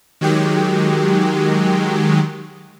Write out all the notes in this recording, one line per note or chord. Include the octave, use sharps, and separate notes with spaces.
D#3 F#3 G#3 G4